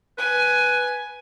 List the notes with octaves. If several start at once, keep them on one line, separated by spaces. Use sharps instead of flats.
B4 G#5